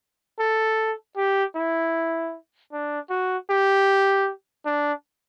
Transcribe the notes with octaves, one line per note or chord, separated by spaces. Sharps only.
A4
G4
E4
D4
F#4
G4
D4